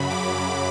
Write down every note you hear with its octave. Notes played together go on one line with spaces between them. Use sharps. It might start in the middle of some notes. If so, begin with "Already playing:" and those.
Already playing: F#2 C#3 F#3 B5
D6